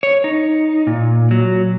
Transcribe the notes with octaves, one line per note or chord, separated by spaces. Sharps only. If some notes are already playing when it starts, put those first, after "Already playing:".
C#5
D#4
A#2
F#3